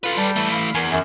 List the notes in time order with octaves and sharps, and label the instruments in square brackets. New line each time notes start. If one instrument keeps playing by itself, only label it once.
[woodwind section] F4 [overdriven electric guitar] A4 B4
[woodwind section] G3 A5
[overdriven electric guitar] E3 A3
[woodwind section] F5 B5
[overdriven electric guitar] E2 [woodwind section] A#4 G#5
[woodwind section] F#2